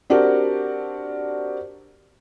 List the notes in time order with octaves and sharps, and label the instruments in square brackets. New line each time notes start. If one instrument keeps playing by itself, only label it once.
[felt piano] C4 D4 F#4 G4 A#4